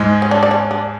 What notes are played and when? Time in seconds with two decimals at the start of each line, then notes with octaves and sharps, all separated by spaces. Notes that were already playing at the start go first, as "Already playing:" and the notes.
Already playing: G#2 G#3
0.22 C#4
0.31 D4
0.43 D4
0.51 C#4
0.71 D4